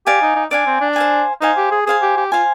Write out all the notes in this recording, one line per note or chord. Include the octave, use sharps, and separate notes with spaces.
G4 D5 F5 G#5
D#4
D#4
D4 D5 F5 G#5
C4
D4
C5 F5 G#5
D#4 C5 F5 G#5
G4
G#4
G#4 C5 F5 G#5
G4
G4
F4 C5 F5 G#5